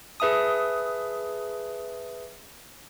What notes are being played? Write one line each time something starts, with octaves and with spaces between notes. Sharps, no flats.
G#4 B4 E5 A5 D#6